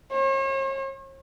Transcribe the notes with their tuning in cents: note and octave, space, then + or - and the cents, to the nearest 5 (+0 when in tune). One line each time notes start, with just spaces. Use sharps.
C#5 -45